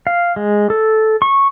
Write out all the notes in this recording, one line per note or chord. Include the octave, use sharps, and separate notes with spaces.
F5
G#3
A4
C#6